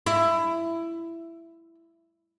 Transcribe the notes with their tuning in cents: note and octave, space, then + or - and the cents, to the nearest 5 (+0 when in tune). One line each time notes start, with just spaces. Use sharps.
E4 +15